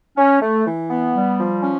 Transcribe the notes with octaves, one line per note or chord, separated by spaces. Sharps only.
C#4
A3
E3
B3
G3
F3
C#4